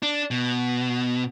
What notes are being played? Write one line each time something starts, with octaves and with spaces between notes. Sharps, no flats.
D4
B2